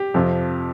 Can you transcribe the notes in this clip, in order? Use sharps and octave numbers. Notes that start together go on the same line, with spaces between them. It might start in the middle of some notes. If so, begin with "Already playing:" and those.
Already playing: G4
F2 C3 F3